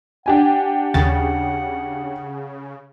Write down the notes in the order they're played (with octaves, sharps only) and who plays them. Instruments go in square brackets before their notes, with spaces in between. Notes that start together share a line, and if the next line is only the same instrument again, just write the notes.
[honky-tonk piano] D4 G4 G#5 [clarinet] F#5
[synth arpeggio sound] D#2 A6 [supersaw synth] C#3